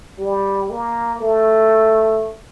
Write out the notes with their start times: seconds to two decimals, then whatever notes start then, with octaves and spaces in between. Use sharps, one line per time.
0.19 G3
0.70 A#3
1.21 A3